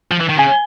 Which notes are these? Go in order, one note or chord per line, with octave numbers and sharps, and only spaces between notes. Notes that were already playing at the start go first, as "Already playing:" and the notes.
F3
E3
D#3
C#3 G#5